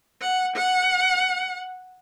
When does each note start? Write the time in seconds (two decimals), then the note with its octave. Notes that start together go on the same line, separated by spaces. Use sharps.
0.21 F#5
0.56 F#5